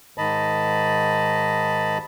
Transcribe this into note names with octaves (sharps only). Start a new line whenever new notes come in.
G#2 D#3 D#5 A5 B5